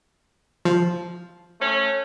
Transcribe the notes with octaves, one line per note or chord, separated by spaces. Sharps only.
F3
A3 C#4